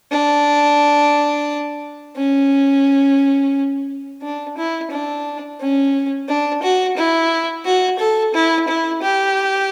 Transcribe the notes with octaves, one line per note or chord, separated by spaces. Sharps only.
D4
C#4
D4
E4
D4
C#4
D4
F#4
E4
F#4
A4
E4
E4
G4